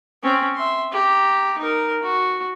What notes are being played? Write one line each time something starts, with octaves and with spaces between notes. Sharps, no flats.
C4 C#4
E5 C6
G4 A#5
D#4 A#4
F#4